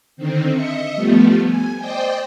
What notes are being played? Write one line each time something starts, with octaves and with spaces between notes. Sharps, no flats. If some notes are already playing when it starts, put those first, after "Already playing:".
D3 D#3 C4
D#5 E5 C#7
F3 G3 A3 B3
G#5
C5 D5 D#5 G5